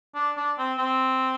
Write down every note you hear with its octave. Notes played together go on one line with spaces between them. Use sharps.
D4
D4
C4
C4